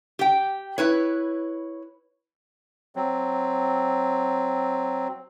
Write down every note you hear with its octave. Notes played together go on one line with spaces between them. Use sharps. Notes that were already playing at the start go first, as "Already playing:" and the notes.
G4 G5
E4 B4 C#5
F#3 C4